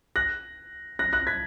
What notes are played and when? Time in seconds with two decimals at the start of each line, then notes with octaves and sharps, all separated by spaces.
0.16 F#6 A#6
0.99 F#6 A#6
1.13 F#6 A#6
1.27 G#6 B6